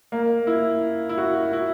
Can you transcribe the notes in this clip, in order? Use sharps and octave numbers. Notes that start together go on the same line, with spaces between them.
A#3
E4
E4
F#4
E4